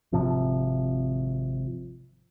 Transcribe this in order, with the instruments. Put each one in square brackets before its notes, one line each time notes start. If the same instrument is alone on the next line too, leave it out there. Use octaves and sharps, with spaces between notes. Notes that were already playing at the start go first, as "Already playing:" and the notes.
[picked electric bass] G#1 C3 F3